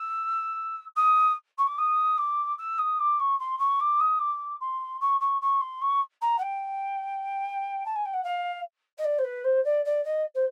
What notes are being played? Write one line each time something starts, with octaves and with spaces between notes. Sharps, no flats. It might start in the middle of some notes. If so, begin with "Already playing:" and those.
Already playing: E6
D#6
C#6
D6
D#6
D6
E6
D#6
D6
C#6
C6
C#6
D6
D#6
D6
C6
C#6
C#6
C#6
C6
C#6
A#5
F#5
G5
A5
G#5
G5
F#5
F5
D#5
D5
C5
B4
C5
D5
D5
D#5
C5